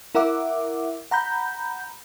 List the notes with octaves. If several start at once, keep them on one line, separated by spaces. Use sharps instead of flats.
E4 A#4 E5 F#5 D6
F#5 A#5 B5 G6